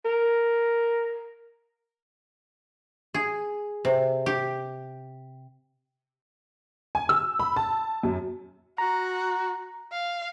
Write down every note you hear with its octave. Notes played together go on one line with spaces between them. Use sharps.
A#4
G#4
C3
G4
G#5
E6
B5
A5
F#2
F#4 A#5
F5